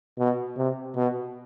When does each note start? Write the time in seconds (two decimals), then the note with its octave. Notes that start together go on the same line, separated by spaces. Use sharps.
0.19 B2
0.57 C3
0.96 B2